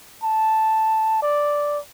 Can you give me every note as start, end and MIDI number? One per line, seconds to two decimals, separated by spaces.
0.23 1.22 81
1.22 1.79 74